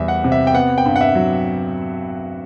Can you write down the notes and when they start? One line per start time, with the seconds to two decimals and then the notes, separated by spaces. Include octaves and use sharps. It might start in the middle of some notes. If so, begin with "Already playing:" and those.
Already playing: E2 G3 E5
0.08 F#5
0.24 C3
0.32 E5
0.47 G5
0.54 B3 F#5
0.78 G5
0.85 G2
0.96 F#5
1.01 E5
1.15 F#3